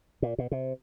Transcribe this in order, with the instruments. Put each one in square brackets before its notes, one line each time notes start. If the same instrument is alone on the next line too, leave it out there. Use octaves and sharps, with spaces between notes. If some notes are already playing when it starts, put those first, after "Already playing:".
[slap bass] A#2
B2
C3